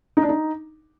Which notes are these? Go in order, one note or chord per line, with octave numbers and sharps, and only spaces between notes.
D#4
D4
D#4